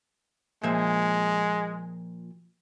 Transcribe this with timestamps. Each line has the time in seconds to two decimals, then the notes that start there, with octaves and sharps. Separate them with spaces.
0.63 A#2 F3 G#3 E5